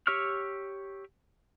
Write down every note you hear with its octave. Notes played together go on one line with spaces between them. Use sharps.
G4 C#5 C#6 E6 F6